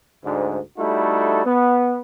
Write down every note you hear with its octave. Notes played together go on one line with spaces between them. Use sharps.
D2 G#2 D3
G3 A3 D#4 E4 F#4 A4
B3